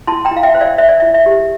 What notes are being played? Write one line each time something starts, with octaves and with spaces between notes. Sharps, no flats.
E4 A5 C6
G5 A#5
E4
F5
E5 G5
C5
D5 F5
C5 E5
D5
E4 E5
E5
G4